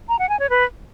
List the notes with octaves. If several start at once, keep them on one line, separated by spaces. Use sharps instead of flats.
A#5
F#5
G#5
C#5
B4